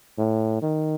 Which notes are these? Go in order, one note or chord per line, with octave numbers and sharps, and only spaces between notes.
A2
D#3